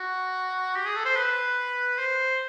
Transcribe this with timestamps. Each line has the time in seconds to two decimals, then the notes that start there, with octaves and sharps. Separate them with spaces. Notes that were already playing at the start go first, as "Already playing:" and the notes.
Already playing: F#4
0.75 G4
0.85 G#4
0.96 A4
1.05 C5
1.16 B4
1.98 C5